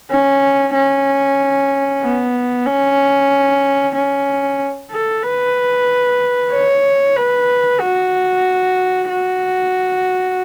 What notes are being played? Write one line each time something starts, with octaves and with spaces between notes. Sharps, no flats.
C#4
C#4
B3
C#4
C#4
A4
B4
C#5
B4
F#4
F#4